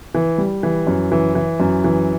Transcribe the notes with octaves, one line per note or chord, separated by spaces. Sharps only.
E3
G3
E3
F#2
E3
E3
F#2
E3